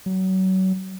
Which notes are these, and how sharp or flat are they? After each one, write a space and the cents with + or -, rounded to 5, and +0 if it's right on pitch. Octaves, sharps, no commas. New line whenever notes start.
F#3 +30